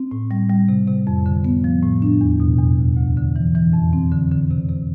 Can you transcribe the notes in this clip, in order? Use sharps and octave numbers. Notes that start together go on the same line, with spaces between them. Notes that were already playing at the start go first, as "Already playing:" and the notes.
Already playing: C4
A2
G3
G3
C3
C3
F2
D3
B3
F3
A2
D4
E2
B2
E2
D2
D2
D3
E3
E3
F2
C4
D3
D3
C3
C3